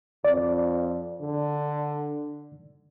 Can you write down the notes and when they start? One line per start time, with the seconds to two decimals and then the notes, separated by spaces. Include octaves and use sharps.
0.25 F2 D5
1.20 D3